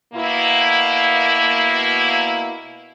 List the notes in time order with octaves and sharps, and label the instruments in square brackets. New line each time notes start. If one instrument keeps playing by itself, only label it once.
[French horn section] B2 A#3 E4